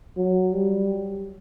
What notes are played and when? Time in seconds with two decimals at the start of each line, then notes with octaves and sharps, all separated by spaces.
0.17 F#3
0.53 G3